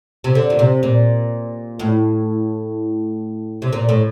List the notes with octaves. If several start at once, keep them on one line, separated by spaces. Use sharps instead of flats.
C3
D3
A#2
C3
A#2
A2
C3
A#2
A2